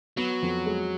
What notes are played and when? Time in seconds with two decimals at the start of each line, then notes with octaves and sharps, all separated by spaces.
0.17 F#3 B3
0.42 F2
0.66 G#3